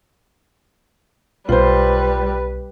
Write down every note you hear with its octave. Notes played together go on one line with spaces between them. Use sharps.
B1 B2 G3 F4 B4 C5